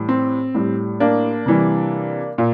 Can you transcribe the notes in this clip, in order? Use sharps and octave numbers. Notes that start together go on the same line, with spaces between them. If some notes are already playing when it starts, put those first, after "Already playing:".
Already playing: A2 E3 G3
C4
A2 G3
A#3 D4
C3 E3 G3
A#2